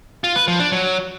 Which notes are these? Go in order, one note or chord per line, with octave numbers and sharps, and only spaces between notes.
F4
B4
F3
D4
F#3